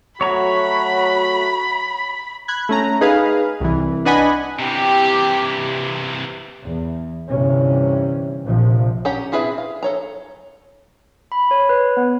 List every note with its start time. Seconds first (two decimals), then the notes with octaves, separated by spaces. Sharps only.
0.21 F#3 A3 F#4 C#5 A#5 B5 C#6
2.48 B5 F#6 G#6
2.69 A3 C#4 A#5
3.01 D#4 G#4 B4 F5
3.61 C2 E3
4.05 D4 B4 D#5 F#5 G#5 B5
4.59 C3 E3 G4
6.63 E2
7.27 G1 G2 C3 E3 C#4
8.44 A#1 C3 F3
9.05 C#4 G4 C#5 F#5 A#5
9.32 C4 E4 G#4 B4 E5
9.58 F5
9.83 A4 C#5 A#5
11.32 B5
11.51 C#5
11.69 B4
11.97 B3